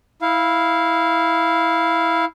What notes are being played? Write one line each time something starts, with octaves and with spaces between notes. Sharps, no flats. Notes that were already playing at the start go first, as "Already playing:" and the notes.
E4 F5